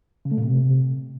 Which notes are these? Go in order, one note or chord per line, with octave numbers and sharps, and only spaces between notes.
C#3
A3
A#2
C3